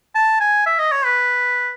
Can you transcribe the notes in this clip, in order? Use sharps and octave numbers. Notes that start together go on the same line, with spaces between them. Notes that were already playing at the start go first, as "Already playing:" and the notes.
A5
G#5
E5
D#5
C#5
B4